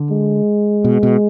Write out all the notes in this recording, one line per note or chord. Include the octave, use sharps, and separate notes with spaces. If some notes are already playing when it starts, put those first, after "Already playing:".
Already playing: D3
G#3
B2
B2